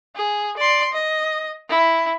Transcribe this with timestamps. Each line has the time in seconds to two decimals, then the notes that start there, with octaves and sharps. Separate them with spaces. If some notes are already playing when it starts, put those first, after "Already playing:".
0.16 G#4
0.57 D5 C6
0.93 D#5
1.69 E4